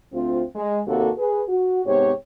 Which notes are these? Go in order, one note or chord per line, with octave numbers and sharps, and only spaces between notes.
D2 C4 F4
G#3
D#2 C3 A#3 F#4 A4
G#4 B4
F#4
G#2 C3 B3 G4 C#5